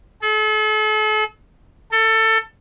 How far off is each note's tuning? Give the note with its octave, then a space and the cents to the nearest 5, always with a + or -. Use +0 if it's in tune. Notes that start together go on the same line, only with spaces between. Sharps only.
A4 -40
A4 +20